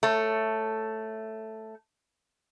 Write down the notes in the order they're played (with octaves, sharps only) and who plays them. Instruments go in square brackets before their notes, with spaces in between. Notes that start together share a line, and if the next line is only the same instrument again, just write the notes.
[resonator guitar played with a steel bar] A3 C#5